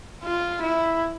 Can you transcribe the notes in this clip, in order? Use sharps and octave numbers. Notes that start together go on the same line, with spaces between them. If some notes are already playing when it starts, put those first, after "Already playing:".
F4
E4